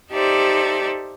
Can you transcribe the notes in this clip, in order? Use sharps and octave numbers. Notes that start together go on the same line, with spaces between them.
D#4 G4 A4 C5 D5 E5